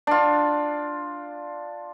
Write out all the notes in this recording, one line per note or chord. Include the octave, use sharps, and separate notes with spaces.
D4 F4